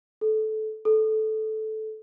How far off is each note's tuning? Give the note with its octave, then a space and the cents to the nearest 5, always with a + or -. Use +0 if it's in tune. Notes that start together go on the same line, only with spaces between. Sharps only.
A4 -20
A4 -15